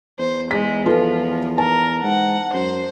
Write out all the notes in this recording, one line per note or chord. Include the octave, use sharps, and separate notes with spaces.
E2 C5
G#3 B6
F3 F4 A4 B4
A#4 A5
G#2 F#5
F#2 C5